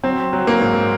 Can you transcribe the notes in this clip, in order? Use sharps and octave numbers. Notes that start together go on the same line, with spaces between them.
F#3 C4
F#3
A#3
G#2